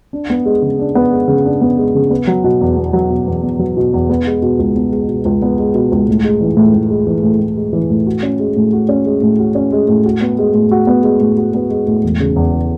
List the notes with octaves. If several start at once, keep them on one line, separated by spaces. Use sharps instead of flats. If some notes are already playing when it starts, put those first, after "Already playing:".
D4
B3
G#3
C#3
D4
B3
G#3
C#3
D4
B3
G#3
C#3
B3
F#3
B2
E2
B3
F#3
B2
E2
B3
F#3
B2
E2
B3
G#3
B2
C#2
B3
G#3
B2
C#2
B3
G#3
B2
C#2
A2
G#3
E3
A2
A2
G#3
E3
A2
A2
G#3
E3
A2
F#4
C#4
G#3
A2
F#4
C#4
G#3
A2
F#4
C#4
G#3
A2
F#4
B3
G#3
A2
F#4
B3
G#3
A2
F#4
B3
G#3
A2
E1
C#3
E2